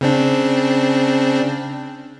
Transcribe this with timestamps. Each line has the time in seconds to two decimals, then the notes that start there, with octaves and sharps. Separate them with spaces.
0.01 C#3 C4 D4